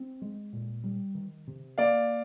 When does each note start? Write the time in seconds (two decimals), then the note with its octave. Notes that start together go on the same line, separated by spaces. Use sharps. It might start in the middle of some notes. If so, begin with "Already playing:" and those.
Already playing: C4
0.22 G#3
0.53 A#2
0.84 G3
1.15 D#3
1.47 C3
1.78 A#3 D5 F5